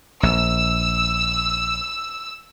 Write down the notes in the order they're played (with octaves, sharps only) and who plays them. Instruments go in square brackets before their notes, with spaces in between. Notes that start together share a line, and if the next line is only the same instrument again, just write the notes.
[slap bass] A#1 [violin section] E6